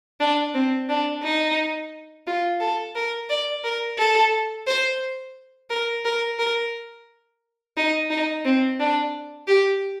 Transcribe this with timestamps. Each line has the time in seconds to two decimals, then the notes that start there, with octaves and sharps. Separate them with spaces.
0.20 D4
0.54 C4
0.89 D4
1.24 D#4
2.26 F4
2.60 A4
2.95 A#4
3.30 D5
3.64 A#4
3.98 A4
4.67 C5
5.70 A#4
6.05 A#4
6.39 A#4
7.77 D#4
8.10 D#4
8.45 C4
8.80 D4
9.48 G4